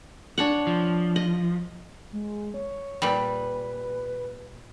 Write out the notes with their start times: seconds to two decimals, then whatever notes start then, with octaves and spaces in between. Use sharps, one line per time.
0.38 D4 C#5 F#5
0.67 F3
1.16 D#5
2.12 G#3
2.54 C#5
3.02 A#2 G3 B4